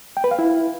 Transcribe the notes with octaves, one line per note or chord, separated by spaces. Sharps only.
G5
B4
F5
E4